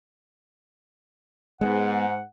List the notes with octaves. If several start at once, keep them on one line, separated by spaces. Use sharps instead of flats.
G#2 G#3 A3 B3 F#5